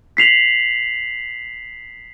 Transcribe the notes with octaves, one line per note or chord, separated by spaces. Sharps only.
B6 C7 F7 F#7